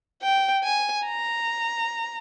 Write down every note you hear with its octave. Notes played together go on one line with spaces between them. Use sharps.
G5
G#5
A#5